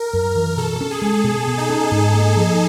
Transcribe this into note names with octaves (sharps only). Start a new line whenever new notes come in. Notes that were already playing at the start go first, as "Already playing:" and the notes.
Already playing: A#4
F#2
E3
B2 A4
C#4
G#4
G#3
B2
B2
D#4
C#4
G#2
A#3
F3